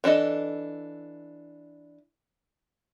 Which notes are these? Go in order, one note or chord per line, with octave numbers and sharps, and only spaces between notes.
E3 D4 A4 D#5